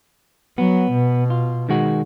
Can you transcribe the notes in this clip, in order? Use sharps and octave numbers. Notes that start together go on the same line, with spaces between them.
F#3 B3
B2
F4
D#3 G#3 F#4